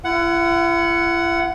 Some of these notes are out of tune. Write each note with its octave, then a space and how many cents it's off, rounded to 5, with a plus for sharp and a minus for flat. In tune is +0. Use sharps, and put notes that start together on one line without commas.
E4 +45 F#5 +5